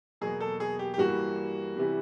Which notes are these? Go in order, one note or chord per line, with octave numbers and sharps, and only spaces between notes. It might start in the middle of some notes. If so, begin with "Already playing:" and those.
E2 B2 F#3 A#3 G#4
A4
G#4
G4
G4
G2 E3 G3 A#3 F#4
C3 E3 G3